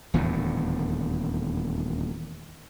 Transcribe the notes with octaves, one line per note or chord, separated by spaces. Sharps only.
D#1 E2 A2 D3